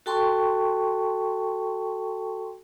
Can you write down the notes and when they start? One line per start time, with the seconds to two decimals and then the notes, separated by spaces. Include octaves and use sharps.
0.06 F#4 A4 G5 A5 C6 C#6